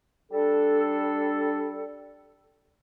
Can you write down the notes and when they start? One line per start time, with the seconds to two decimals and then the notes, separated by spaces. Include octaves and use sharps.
0.32 G3 D4 A4